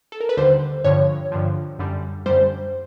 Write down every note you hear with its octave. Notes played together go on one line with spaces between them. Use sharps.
A4
A#4
B4
D#2 D3 G3 C5
G2 D3 F3 C#5
G2 D3 F3
F#2 D3 G3
F#2 D3 G3 C5